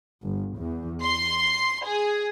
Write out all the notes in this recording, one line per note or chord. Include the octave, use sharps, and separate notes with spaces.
G1
E2
C6
G#4